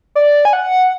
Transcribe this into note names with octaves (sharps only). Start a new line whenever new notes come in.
D5
G#5
F#5